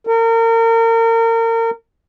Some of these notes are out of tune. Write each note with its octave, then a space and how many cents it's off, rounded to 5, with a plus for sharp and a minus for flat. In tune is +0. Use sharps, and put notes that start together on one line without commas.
A#4 -35